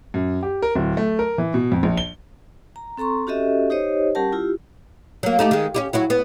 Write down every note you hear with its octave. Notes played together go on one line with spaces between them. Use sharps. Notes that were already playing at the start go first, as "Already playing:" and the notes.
F#2
G4
A#4
D1
A3
A#4
E3
B2
F2
A#1
G7
A#5
C4 A4 A#5 C6 C#6
C#4 F#4 G4 A4 D#5 E5
D#4 G4 C5 C#5 D#5
G3 C#4 G4 A#4 F#5 A5
E4 F4 G4
F#3 A#3
A3 D#4 G4
D#3 G#3
C#4 E4 G4
F#3 E4 F#4
B3